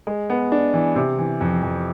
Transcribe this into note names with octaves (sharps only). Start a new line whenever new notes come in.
G#3
B3
D4
E3
C3
E3
F2
F2